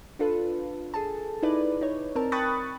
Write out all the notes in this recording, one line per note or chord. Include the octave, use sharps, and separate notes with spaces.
D4 F4 A4 B4
G#4 A4 A5
D#4 E4 B4 D5
D#4 C#5
C4 A#4 A5
G5 B5 C#6 D#6 F#6 A6